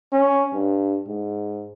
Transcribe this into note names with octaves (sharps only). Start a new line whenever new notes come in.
C#4
G2
G#2